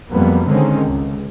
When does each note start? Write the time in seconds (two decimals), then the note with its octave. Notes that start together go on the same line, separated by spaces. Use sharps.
0.12 F2 F#3 G3 A#3 B3
0.48 D3 D#3 G#3 C4 C#4
0.87 C#2